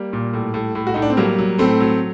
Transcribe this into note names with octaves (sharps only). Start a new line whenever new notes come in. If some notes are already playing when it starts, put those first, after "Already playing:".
Already playing: G3 A#3
A#2
A2
A2
A2
F#4
A2 D#4
D4
C4
F#3 G3 A#3
F#3
A2 A3 C4
F#3